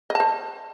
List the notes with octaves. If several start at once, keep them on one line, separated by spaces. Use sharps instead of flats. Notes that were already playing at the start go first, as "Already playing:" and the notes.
C5 D#5 A5